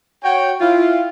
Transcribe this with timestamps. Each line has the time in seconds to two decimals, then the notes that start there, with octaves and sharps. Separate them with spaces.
0.23 F#4 C#5 G5
0.61 E4 F4 F5